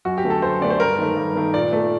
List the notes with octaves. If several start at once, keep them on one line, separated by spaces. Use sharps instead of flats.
F#2 F#4
G4
D3 A3
A4
F#2 C5
D3 A3 D5
C5
G2 A#4
D#3 A3
G2
D#3 A3
A#2 D5
A3